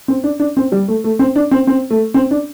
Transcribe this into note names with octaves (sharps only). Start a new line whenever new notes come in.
C4
D4
D4
C4
G3
A3
A3
C4
D4
C4
C4
A3
C4
D4